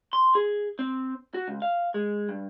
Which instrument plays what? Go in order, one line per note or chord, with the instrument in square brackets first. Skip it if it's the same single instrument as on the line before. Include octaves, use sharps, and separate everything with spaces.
[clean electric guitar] C6
G#4
C4
F#4
C#2
F5
G#3
G2